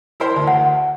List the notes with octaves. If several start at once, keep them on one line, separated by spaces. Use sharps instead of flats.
E4 A#4 C5
D2
F#5